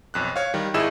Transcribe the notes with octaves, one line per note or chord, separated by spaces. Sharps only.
B1 F2 F#6
C#5 F5
D#3 G3
G#1 E4 G#4 D#5 E6 E7